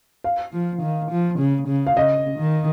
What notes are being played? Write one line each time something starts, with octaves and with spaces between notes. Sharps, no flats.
F5
F3
D#3
F3
C#3
C#3
F5
C#3 D#5
D#3